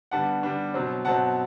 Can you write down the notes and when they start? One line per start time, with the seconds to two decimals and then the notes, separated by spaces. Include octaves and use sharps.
0.11 D3 G3 B3 D4 F#5 A5
0.43 D3 G3 B3 D4
0.74 B2 F#3 C4
1.05 B2 F#3 C4 F#5 A5